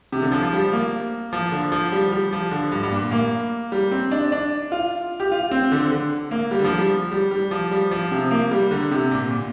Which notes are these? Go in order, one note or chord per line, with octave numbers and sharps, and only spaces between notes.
C3
D3
F3
F3
G3
A#3
F3
D3
F3
G3
G3
F3
D3
G2
G2
A#2
A#3
G3
C4
D4
D4
F4
G4
F4
C4
D3
D3
A#3
G3
D3
F3
G3
G3
G3
F3
G3
F3
C3
A#3
G3
D3
C3
A#2
A#2